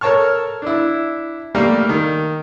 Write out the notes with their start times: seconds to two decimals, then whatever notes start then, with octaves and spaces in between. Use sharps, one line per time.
0.01 A4 A#4 C#5 A5 C#6 F6
0.62 D4 E4
1.55 G3 A3 A#3 A#4 F5
1.89 D#3